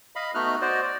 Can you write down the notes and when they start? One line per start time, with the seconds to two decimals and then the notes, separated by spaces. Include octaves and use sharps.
0.16 D#5 F5 B5
0.34 A3 B3 D#4 F#4 F6 F#6
0.61 F#4 C5 D5 D#5
0.82 D5